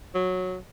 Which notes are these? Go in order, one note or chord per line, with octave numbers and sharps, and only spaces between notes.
F#3